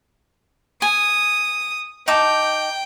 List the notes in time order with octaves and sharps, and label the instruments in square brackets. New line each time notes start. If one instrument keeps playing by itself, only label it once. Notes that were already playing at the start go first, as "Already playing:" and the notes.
[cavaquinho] G#5 [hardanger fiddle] D#6
[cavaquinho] D#4 A5 D6 [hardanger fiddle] G5